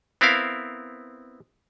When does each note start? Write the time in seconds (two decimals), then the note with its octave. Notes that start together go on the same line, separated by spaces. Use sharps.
0.21 B3 C4 E4 A#4 F5